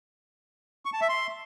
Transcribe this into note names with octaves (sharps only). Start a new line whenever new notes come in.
C#6
A5
E5
C6